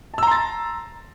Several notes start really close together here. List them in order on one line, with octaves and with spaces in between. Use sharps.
A5 E6 A#5 C6 A6